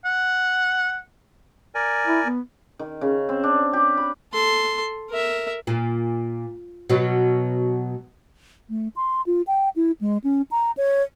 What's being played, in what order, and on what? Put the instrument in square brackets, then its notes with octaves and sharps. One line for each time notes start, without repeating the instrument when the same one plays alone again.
[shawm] F#5
[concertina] A#4 D5 G#5
[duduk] E4
B3
[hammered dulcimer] D#3
C#3
C4
D4
G4
B5
[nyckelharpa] A4 C6
A#4 E5
[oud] A#2
B2 F#3
[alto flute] A3
C6
F4
G5
E4
G#3
C#4
A#5
C#5